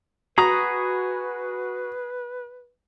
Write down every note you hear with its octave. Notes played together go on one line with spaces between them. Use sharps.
F#4 G#4 B4 A#5 B5 D#6